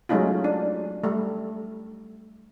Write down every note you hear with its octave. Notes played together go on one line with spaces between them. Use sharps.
F#3 G#3 A3 C#4 D#4 F4
D4
G3 A3